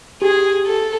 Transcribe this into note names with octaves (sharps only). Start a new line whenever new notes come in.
G4 G#4
A4